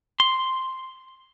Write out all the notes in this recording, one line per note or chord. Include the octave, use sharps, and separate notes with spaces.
C6